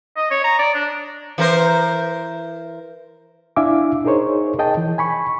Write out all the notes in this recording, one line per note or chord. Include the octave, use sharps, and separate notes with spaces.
D#5
C#5
A#5
D5
D4
E3 A#4 C5
D4 E4 E5 F5 G#5 D6
D#4 G#4 A#4 C5 C#5
G#4 D#5 G5 A5
E3
G#5 B5 C#6